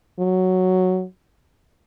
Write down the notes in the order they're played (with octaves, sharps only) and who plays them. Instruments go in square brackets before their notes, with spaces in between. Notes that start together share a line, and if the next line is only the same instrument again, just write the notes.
[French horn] F#3